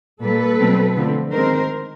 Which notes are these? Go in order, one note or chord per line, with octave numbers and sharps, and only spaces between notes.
A#2 G3 A#3 A4 B4
B2 F#3 A3 C4
D3 F3 A3 C4
D#3 G#3 C4 A#4 C5